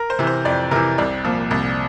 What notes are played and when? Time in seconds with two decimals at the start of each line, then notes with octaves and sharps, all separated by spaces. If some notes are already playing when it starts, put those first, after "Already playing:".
Already playing: A#4
0.10 C5
0.19 C3 E3
0.27 C5
0.45 F2 D5
0.71 C3 E3 A#4
0.98 C2 D5
1.25 A#2 F3
1.51 C2